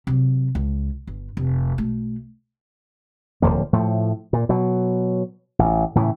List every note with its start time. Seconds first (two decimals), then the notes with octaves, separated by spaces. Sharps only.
0.07 C3 F#3
0.55 C#2
1.07 G1
1.37 F1
1.78 B1 A3
3.42 D1 E2 F3 A#3
3.73 A2 F3 A3
4.33 A#2
4.49 B2 F#3
5.59 A1
5.95 A2 C#3 E3